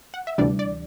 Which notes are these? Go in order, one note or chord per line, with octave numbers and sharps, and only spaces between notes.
F#5
E5
D2 C3 E3 G3 D4 D5
D5